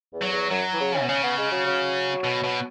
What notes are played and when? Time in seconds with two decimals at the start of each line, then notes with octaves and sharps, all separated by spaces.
0.13 E2
0.22 F#3
0.32 E2
0.51 F#2 F#3
0.73 E3
0.80 C#3
0.94 C#4
1.00 B2
1.08 C#3 C#4
1.23 B3
1.38 G#3
1.52 F#3
1.66 F#3
2.24 B2
2.44 B2